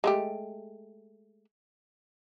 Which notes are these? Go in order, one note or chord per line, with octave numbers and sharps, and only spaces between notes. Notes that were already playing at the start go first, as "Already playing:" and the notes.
G#3 A3 G4